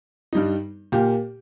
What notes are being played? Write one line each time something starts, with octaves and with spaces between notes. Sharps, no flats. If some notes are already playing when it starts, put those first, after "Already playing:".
G2 G3 D#4
A#2 A#3 G4